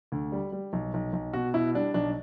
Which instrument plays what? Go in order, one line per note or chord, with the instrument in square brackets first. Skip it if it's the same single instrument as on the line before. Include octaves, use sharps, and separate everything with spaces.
[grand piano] D2
G3
G3
B1
B1
B1
B2 F#4
B2 E4
G3 D4
B1 D4